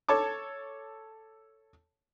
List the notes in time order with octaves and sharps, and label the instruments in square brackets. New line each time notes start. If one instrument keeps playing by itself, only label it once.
[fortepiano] A4 C#5 A5 C#6 D6